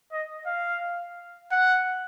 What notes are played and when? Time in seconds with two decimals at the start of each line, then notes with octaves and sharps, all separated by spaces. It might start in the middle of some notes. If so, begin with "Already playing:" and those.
0.12 D#5
0.46 F5
1.52 F#5